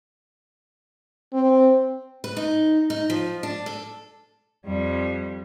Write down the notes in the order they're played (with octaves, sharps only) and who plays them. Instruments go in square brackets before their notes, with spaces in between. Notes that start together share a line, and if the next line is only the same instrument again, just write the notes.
[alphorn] C4
[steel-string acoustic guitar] B4
D#4
D#4
F3
D4
A4
[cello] F2 G3